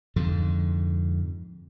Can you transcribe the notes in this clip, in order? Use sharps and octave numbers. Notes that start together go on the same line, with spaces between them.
F2 G#2 D3